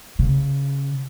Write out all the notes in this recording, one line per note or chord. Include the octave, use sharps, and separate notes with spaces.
C#3